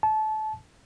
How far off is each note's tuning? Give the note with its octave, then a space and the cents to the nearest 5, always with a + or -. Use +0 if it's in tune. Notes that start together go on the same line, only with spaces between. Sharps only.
A5 -25